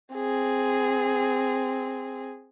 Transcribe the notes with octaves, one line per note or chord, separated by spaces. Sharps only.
C4 G#4